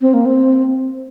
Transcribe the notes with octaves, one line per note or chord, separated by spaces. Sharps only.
C4
A#3
C4